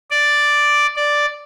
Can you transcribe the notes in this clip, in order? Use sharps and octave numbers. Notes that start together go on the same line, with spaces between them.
D5
D5